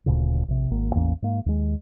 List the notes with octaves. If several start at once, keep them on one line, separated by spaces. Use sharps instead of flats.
D1 D2 A#2 C#3
A#1 C3
G#1 A#3
A1 E2 A#3 C#4
G#2 A#3
D#2 G#3